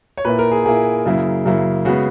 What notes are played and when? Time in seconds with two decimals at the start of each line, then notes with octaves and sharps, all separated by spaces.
0.17 C#5
0.25 A#2 A#3 E4 B4
0.39 A#4
0.52 G#4
0.66 A#2 A#3 E4 G#4
1.05 F#2 C#3 F#3 A#3 E4
1.45 F#2 C#3 F#3 A#3 E4
1.85 C#3 G#3 B3 F#4